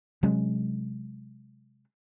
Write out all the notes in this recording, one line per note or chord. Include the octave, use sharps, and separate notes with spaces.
C3 F#3 G#3 C#4